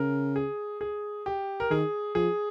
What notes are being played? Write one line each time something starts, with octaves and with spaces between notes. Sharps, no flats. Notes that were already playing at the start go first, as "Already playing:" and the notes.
Already playing: C#3 A#4
G#4
G#4
G4
A#4
D#3 G#4
F3 G#4